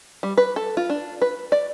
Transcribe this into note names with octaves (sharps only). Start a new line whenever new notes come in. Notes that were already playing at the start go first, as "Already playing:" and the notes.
G3
B4
A4
F4
D4
B4
D5